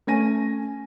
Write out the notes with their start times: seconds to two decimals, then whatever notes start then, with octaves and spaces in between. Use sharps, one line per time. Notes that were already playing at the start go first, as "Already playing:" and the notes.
0.07 A3 C#4 G#5 A#6 D#7